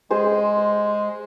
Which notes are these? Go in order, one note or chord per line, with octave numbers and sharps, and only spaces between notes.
G#3 G#4 C5